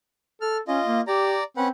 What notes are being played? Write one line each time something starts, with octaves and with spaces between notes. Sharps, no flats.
A4 F6
C#4 F4 D#5
A#3
G4 D5 A#5
C4 C#4 B4 F#5